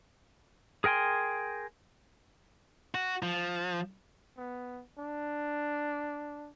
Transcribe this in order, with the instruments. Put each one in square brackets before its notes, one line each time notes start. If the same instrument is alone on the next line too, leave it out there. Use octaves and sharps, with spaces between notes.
[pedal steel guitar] G#4 A#4 G5 G#5 C6
[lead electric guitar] F#4
F3
[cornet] B3
D4